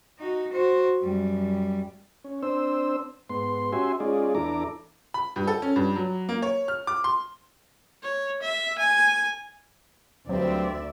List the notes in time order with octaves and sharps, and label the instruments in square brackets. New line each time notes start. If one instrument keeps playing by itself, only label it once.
[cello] D#4 F#4
F#4 C5
F#2 G3
[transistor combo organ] C#4
C4 D4 C5 E6
G#2 B3 C6
C#4 F#4 G4 E5 G#5 C6
G#3 C#4 D#4 F4 G#4 D5
E2 D4 E4 A4 A#5 D6
[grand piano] B5
G2
A4
C#4
G2
F#3
A#3
C#5
F6
D6
C6
[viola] C#5
E5
G#5
[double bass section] D2 [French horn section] G2 C4 [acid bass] F#3 [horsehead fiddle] D5 E5